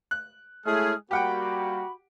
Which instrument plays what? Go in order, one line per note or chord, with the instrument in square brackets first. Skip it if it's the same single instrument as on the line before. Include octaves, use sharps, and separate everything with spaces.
[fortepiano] F#6
[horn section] G#3 G#4 [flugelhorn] A3 [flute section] E4 C#5 F6
[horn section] G3 A#3 [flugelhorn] F#4 [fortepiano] G4 F#5 G5 [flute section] B5